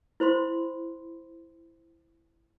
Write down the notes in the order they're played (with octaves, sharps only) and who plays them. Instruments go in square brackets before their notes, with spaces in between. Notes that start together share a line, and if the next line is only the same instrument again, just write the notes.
[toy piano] E4 C5 B5 C6